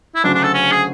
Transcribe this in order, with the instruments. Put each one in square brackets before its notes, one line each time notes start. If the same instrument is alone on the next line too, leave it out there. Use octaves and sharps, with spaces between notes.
[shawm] E4
[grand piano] D2 C#3 F#3 C#4 F#4 [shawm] D4
[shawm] D4
A4
C#4
G#4